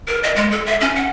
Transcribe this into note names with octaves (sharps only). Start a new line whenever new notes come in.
A#4
D#5
G#3
A4
E5
C#4
F#5